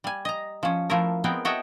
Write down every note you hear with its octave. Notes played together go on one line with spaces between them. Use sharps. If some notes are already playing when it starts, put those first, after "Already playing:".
G3 G#5
D#5 A#5
F3 C#4
F3 A3 E4 A#4
G#3 B3 C4 A#4 G5
F#4 A4 C#5 D#5 E5 G5